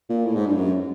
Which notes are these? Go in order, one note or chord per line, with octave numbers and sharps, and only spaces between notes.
A#2
A2
G#2
G2
F#2